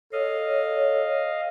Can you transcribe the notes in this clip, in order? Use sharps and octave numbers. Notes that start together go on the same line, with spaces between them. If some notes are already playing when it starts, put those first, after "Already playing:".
A4 C#5 D#5 F5